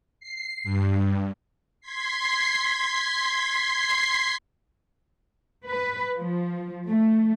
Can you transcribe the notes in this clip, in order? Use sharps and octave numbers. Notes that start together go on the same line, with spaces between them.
C7
G2
C6 G#6 B6 C7
B4
F3
A3